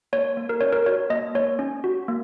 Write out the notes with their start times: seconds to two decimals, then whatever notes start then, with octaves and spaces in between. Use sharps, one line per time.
0.13 A#3 C#5
0.37 A#3
0.49 A#4
0.61 C#4 C#5
0.73 A#4
0.86 F#4 C#5
1.10 A#3 D#5
1.35 A#3 C#5
1.59 C#4
1.84 F#4
2.08 A#3